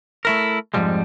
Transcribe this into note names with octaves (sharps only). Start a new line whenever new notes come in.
A3 E4 A#4
F2 G#2 D3 F3 G3 G#3